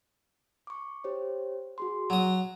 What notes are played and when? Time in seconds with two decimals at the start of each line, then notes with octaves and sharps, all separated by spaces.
0.67 C#6 D6
1.04 G4 C5 C#5
1.78 F#4 G#4 C6
2.10 F#3 F#5 D#6